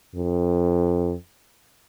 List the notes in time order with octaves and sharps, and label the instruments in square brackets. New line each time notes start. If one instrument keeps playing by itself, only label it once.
[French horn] F2